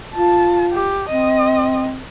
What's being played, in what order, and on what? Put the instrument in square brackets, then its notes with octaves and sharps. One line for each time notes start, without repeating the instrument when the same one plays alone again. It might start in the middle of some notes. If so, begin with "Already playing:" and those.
[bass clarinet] F4 [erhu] A5
[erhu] G4
[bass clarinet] C4 [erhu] D#5